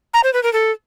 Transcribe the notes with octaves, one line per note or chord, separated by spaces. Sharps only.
A#5
C5
B4
A#4
A4